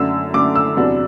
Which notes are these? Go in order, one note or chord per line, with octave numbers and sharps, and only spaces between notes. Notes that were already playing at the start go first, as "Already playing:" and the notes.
Already playing: F#2 D3 A3 E6
F#2 D3 A3 D6
E6
E2 C3 F#3 B3 D4